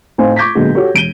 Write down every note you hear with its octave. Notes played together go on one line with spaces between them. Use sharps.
A2 C4 D#4 C5 F5 G#5
C#6 D6 G6 G#6 A#6 B6
A#2 D3 F#3 G#3 B3
F#4 G4 A4 C#5
E1 D7 D#7 G7